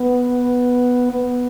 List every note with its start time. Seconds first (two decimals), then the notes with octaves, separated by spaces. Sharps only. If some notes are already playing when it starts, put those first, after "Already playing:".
Already playing: B3
1.11 B3